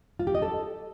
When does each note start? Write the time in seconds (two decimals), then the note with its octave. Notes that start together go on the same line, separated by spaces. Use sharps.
0.19 F4
0.27 G4
0.35 D#5
0.42 A4